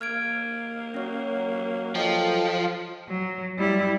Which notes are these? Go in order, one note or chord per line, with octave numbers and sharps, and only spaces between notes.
A#3 F6 G#6 D7
F#3 C#4 C#5
F3 A4 D#5 G5
F#3
G3 E4